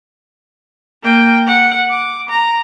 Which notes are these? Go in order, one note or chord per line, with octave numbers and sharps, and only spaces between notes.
A#3 G5
F#5
D6
A#5